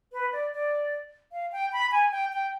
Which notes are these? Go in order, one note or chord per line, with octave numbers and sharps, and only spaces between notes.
B4
D5
D5
F5
G5
B5
G#5
G5
G5